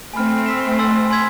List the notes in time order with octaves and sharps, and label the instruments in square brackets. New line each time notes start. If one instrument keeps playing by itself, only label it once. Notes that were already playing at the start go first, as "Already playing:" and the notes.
[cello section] A3 C4 [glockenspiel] G#5 B5 F6
[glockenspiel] E6 B6 E7
G#5 C6 E6 A6
G#5 C6 E6 G#6 B6